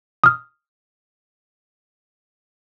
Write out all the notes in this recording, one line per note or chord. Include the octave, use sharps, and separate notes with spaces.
D#6 F6